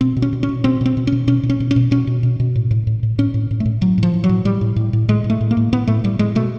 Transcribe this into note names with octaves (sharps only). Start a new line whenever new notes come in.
B2 C4
B2
C#4
B2
C#4
B2
B2 C4
B2 C4
B2
C#4
B2
B2 C#4
B2
C#4
B2
C#4
B2
B2 C#4
B2
B2
B2
A2
A2
A2
A2
A2 C#4
A2
A2
A3
A2
A2 F#3
A2 F3
A2
F#3
A2
A2 G3
A2
A2
A2
A2 G#3
A2
A3
A2
A#3
A2
A2 B3
A2 A3
A2 G3
A2 G#3
B2 A3